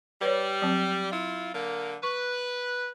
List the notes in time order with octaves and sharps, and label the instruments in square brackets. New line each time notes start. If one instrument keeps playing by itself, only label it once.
[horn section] G3 [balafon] B4 C#5
[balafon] F#3 C4
[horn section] E4 F4
D3 A#3
[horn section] B4 [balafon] C#6